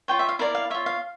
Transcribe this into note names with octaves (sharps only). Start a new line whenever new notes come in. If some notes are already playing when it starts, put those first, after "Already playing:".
F4 C#5 G5
E5
F5
E4 A#4 D5 F5
F5
F4 C#5 E5
F5